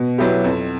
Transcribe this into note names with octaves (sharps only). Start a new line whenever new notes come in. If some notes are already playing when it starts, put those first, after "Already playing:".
Already playing: B2
F#3 B3 E4 G4
F2